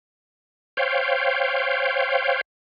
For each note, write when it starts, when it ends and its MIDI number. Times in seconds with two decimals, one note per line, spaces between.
0.77 2.41 72
0.77 2.41 73
0.77 2.41 77
0.77 2.41 79